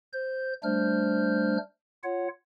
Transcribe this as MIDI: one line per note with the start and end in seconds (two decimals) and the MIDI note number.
0.13 0.53 72
0.13 0.53 91
0.63 1.58 55
0.63 1.58 57
0.63 1.58 62
0.63 1.58 72
0.63 1.58 89
0.63 1.58 91
2.03 2.28 65
2.03 2.28 73
2.03 2.28 78